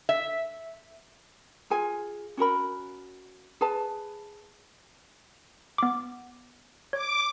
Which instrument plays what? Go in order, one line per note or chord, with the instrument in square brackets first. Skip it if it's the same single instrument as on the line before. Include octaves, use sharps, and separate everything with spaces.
[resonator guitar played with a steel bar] E5
[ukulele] F4 G#4 G#5
C#4 F#4 A#4 B5
G#4 B4 A5
[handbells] B3 D6
[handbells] C#5 [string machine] D6